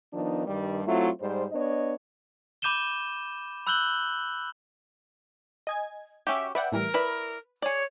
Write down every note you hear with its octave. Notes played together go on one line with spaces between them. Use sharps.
D#3 F3 B3 D4 D#4
G2 D#3 G3
F#3 A3 C4 E4 F4
G#2 G3 C5
B3 D4 C#5 D#5
B5 D6 G6 D#7 E7 G7
B5 E6 F#6 G6 F#7 G7
D#5 G#5 G#6
C#4 F#4 G4 E5 G5 D6
B4 D5 E5 F#5 G5
A2 E3 G3 A#4
E4 B4 D5 B5
G#4 C#5 D5